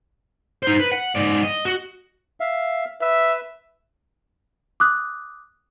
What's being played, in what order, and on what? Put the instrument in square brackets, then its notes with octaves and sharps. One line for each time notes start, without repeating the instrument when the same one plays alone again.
[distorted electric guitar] D#4 C5
B4
F#5
G#2 D5
D#5
F#4
[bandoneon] E5 F5
[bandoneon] B4 [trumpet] E5
[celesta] D6 D#6 F#6